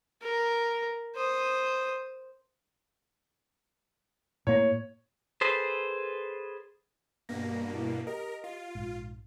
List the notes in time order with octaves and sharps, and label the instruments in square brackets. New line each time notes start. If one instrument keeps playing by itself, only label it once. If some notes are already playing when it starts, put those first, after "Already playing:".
[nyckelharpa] A#4
C5 D#6
[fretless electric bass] A2 A#3 [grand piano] C#5
[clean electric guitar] G#4 A4 B4 C5
[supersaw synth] G2 B2 A#3 [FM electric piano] A#6
[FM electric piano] E4 A5
[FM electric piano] G4 D#5 [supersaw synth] A#4
[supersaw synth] F4
[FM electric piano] A#1 G#2